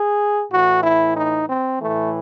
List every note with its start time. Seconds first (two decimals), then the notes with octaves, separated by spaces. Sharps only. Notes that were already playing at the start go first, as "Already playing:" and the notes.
Already playing: G#4
0.51 A2 E3 F#4
0.83 E4
1.17 D#4
1.49 C4
1.81 A2 E3 A3